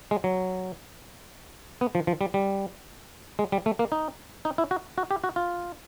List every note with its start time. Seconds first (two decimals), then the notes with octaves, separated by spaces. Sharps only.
0.11 G#3
0.24 F#3
1.81 B3
1.95 F3
2.07 F3
2.21 G3
2.34 G3
3.39 G#3
3.52 G3
3.66 A3
3.79 A#3
3.92 D#4
4.45 D#4
4.58 E4
4.71 F#4
4.98 F#4
5.11 G4
5.24 F#4
5.36 F4